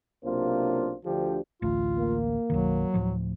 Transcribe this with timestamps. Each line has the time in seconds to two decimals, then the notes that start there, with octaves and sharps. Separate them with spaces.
0.24 B1 C3 A#3 D4 F4 C5
1.05 D2 D3 F3 G4
1.62 A1 D2 A3 F4
1.99 A#3
2.50 B1 F#2 D#3 F#3
2.94 D2 A2 F3